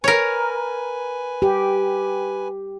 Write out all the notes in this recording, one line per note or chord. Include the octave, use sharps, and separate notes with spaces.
A#4 B4 C#5 G#5
G4